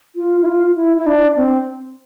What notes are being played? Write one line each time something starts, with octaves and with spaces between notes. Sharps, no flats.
F4
E4
F4
E4
E4
D4
C4